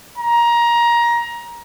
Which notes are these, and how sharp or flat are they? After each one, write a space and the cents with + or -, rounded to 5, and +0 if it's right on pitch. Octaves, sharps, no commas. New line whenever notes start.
A#5 +20